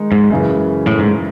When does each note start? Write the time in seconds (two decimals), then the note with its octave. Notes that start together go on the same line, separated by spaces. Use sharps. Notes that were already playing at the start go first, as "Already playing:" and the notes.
Already playing: D#3 G#3 D#4
0.12 G#2
0.30 F#2 C#3 E3
0.87 A2
0.99 G#2